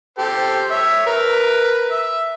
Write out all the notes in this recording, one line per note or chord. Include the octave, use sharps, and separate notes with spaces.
G4 A4 C5
C#5 E5
A#4 B4
E5